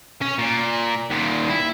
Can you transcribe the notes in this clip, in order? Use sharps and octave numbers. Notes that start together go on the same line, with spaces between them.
C#4
A#2
D#2 A#2
E4